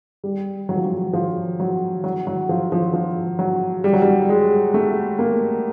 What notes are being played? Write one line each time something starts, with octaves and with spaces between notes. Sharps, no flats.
G3
F#3
F3
F#3
F3
F#3
F#3
F#3
F3
F3
F3
F#3
G3
F#3
G3
G#3
A3
A#3